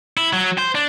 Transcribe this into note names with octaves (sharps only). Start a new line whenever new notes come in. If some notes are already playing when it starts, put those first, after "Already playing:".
E4
F#3
C5
D4